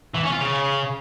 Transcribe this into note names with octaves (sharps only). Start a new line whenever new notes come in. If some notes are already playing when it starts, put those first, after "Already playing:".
E3
C#4
F4
C#3